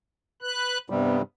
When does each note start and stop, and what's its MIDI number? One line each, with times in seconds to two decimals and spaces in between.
0.42 0.78 71
0.42 0.78 90
0.90 1.22 43
0.90 1.22 48
0.90 1.22 55
0.90 1.17 59